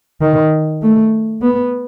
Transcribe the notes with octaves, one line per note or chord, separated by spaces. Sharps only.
D#3
A3
B3